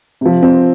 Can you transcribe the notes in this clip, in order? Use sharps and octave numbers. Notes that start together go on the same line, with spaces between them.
C3 F3
C4